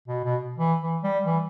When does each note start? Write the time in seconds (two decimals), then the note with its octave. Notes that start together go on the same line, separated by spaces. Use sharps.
0.08 B2
0.25 B2
0.58 E3
0.81 E3
1.03 G3
1.26 E3